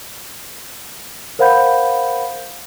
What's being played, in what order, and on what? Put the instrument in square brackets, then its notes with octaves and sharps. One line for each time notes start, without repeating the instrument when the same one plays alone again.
[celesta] A#4 C5 F5 F#5 B5 G6